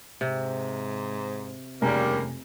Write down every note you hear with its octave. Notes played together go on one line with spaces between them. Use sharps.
G#2 C3
F1 D#2 C#3 G3 A#3 G#5 A#5